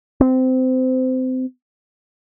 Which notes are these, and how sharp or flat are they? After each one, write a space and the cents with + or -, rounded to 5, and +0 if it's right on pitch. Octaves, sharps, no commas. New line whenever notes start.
C4 -25